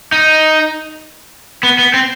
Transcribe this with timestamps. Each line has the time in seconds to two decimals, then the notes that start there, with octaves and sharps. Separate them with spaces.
0.12 D#4
1.63 B3
1.78 B3
1.94 C4